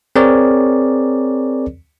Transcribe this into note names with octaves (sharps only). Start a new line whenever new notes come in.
C4 G#4 A#4 C#5 D5